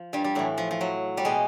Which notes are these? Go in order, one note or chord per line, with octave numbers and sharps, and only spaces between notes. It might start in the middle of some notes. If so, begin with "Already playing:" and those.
Already playing: F3
G2 G3
G3
A2 E3 F#3
F3
F3
F#3
G3
B2 G#3